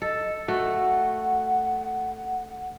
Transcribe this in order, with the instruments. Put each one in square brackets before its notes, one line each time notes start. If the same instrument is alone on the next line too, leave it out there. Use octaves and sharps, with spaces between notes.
[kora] A4 [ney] D#5
[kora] A3 F#4 [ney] F#5